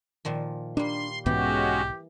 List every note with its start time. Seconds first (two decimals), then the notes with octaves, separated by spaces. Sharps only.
0.25 A#2 D#3 F3
0.77 G3 A#3 D4 C6
1.26 B1 G#2 E3 G#3 B3 C#4 F#4 G4